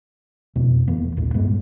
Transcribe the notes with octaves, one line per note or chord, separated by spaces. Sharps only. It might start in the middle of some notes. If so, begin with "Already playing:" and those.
F2 B2
E1 E3 A#3 B3
A1 D#2 A#2
G2 A#2 G#3 B3